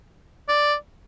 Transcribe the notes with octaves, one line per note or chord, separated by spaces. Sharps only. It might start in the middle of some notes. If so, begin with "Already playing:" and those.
D5